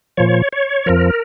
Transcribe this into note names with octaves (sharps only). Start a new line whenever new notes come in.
A#2 F3 C#5
C#5
F2 F3 A#4